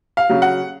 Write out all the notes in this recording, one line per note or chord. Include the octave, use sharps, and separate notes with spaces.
F5
C#3 F#3
F#5